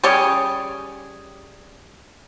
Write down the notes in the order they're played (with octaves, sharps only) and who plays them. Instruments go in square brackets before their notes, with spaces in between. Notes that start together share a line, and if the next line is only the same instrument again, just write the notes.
[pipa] G3 C#4 G4 G#4